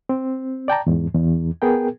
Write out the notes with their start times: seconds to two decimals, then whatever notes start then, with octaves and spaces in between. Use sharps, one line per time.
0.09 C4
0.68 D5 G5 A5 A#5
0.87 E2 G#2
1.14 E2
1.62 B3 G#4 A#4 G5